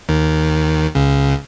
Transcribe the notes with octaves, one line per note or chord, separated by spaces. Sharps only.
D#2 D#3
C#2 C#3